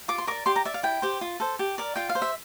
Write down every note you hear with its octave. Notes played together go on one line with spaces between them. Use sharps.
F4 D6
C6
A#4 D5 D6
G4 C6
A#5
D5 E5
F5
E4 G5
G4 C5
F4
A4 C5
G4
A#4 D5
F4 G5
F5
C5
E5